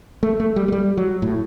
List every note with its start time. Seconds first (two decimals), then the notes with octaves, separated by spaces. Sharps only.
0.23 A3
0.40 A3
0.56 G3
0.68 A3
0.72 G3
0.97 F#3
1.22 A2